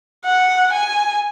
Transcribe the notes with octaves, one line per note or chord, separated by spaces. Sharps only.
F#5
G#5